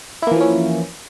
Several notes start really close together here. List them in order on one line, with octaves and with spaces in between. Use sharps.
E4 A#3 E3 F3 C#4